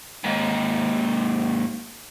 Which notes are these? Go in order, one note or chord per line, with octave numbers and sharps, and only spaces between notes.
D#2 G#2